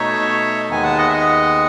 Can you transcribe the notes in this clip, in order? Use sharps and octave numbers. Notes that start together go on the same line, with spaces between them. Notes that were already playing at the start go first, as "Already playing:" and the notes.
Already playing: B2 A3 D#4 C#5 E5
D#2 D#3 G#3 B3 G#5
F#5 A5
D#5 F#5
E5
D#5 F#5